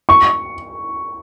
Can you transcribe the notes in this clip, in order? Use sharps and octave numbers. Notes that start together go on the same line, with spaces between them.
C#6